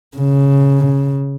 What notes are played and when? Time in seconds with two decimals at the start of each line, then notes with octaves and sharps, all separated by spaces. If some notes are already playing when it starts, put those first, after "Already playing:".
0.17 C#3